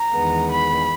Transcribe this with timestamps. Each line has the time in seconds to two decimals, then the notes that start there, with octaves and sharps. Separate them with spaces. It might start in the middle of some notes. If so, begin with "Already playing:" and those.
Already playing: A#5
0.12 E2 D#3 G#3 B3
0.50 B5